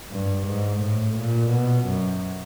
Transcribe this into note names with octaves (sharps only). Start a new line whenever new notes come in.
G2
G#2
A2
A#2
B2
F#2